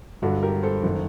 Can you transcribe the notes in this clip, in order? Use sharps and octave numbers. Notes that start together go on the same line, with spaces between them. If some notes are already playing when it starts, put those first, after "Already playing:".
G1 G2 D3 F#4 A4
G4 A#4
A4 C5
F#1 D#3